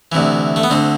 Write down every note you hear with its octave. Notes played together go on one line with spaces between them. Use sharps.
D2 C3 E3
A3
B3
D2 D3 C4